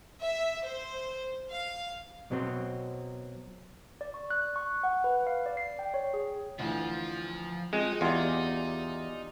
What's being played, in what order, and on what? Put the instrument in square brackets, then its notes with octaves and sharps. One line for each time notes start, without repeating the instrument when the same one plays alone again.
[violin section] E5
C5
F5
[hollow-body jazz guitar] B2 F#3 C4
[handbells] D5
C#6
F#6
C#6
F#5
B4
F5
D5
C7
G5
C#5
G#4
[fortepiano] D2 E3 [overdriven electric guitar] F3
[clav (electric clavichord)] G#3 [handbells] C4 F4 D#5 [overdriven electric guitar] D#4
[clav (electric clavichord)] E2 [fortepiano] F4 G#4 [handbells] G4 D5 C6